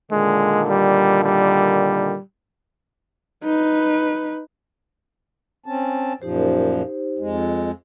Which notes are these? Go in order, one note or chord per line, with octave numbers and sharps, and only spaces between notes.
A#2 D3 D#3 G#3
G3
G3
D#4 B4
C4 C#4 A5
F#2 A#2 F3 D#4 G4 C5
F2 G#3